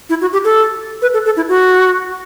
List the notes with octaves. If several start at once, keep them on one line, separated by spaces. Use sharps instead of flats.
E4
F#4
G4
A4
B4
A4
A4
E4
F#4